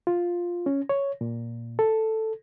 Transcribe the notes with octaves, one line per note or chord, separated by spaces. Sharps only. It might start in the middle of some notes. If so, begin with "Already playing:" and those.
F4
C#4
C#5
A#2
A4